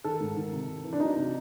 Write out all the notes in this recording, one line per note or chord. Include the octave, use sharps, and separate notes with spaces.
D#3 A4
G#2
D#3
C3
C3
E3
D4
F#3 D#4
C3